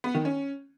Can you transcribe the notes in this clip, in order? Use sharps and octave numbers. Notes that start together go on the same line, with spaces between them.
B3
D#3
C#4